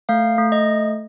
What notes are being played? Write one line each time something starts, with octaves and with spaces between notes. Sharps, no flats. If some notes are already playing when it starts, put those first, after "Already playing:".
A3 F5
A3
D#5